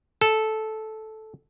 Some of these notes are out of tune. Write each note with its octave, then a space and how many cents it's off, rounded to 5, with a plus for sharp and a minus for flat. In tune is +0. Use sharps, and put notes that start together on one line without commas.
A4 -10